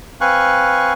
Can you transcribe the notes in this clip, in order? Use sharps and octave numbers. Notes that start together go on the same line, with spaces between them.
C4 B4 F5 G#5 C#6 F#6